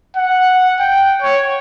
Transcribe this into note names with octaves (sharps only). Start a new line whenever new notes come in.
F#5
G5
C#5